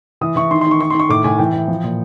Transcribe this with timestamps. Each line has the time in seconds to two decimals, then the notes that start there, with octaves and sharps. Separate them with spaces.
0.21 E3 D#6
0.36 E3 C#6
0.51 D#3 C6
0.61 C6
0.66 D#3 C#6
0.80 D#3 C#6
0.90 C6
0.95 D#3 C#6
1.09 A2 D6
1.24 A2 G#5
1.39 E3 G5
1.54 E3
1.68 F3
1.84 A#2